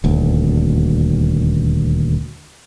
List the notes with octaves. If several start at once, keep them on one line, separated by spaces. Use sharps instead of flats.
D#1 D2